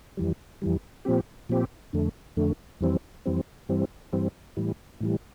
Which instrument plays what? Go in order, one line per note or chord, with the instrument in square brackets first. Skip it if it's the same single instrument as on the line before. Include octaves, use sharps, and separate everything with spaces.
[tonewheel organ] F2 E3 G3
F2 E3 G3
A#2 F3 C4 G4
A#2 F3 C4 G4
F2 D3 A3
F2 D3 A3
F2 E3 G3 C4
F2 E3 G3 C4
G2 E3 G3 C4
G2 E3 G3 C4
A2 E3 G3
A2 E3 G3